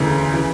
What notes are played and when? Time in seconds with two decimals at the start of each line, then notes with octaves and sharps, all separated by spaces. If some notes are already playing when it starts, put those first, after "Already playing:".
Already playing: E1 D2 C#3 E3
0.34 C#3 E3